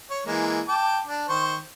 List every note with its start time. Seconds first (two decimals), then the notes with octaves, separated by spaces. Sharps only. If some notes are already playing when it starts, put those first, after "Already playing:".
0.10 C#5
0.26 E3 G#3 A#3
0.68 G5 A5 D6
1.07 D4
1.29 D#3 C5 C#6